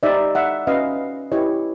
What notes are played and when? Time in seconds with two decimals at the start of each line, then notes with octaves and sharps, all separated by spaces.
0.03 D#4 G4 C5 D5 E5
0.35 E5 F#5
0.67 C#4 F#4 B4 D#5 F5
1.32 E4 G4 B4 C#5 D#5